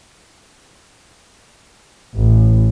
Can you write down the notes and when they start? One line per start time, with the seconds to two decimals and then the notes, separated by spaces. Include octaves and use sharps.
2.15 A1